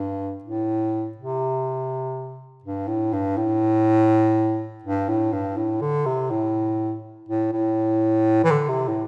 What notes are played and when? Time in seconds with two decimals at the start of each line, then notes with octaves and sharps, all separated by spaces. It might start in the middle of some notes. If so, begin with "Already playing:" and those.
Already playing: G2
0.43 A2
1.17 C3
2.63 G2
2.88 A2
3.13 G2
3.37 A2
4.83 G2
5.09 A2
5.33 G2
5.57 A2
5.81 D3
6.06 C3
6.30 A2
7.29 A2
7.52 A2
8.44 E3
8.51 D3
8.68 C3
8.88 A2